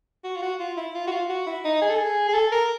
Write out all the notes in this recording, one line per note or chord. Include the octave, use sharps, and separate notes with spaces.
F#4
F4
F#4
F4
E4
F4
F#4
F4
F#4
E4
D#4
G#4
A4
G#4
G#4
A4
A#4